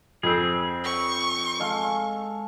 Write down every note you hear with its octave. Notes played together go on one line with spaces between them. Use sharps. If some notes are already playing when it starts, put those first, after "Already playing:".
F2 C4 G#4
C#6
G#3 A4 F5